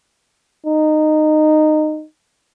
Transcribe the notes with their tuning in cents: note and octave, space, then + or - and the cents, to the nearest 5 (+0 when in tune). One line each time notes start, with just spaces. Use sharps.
D#4 -15